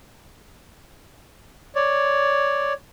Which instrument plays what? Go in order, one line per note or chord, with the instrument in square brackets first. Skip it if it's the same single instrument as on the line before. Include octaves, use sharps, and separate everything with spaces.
[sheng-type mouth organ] C#5 D5